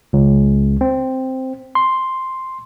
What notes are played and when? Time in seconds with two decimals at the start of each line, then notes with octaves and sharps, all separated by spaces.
0.13 C#2
0.81 C4
1.75 C6